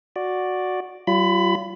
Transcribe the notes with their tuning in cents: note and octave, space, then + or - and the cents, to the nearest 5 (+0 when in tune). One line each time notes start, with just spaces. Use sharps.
F#4 -10 D5 +0
F#3 +45 F4 -25 B5 +15